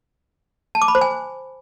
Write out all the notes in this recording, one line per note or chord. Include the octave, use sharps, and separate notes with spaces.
A5
D6
B5
C5
G#5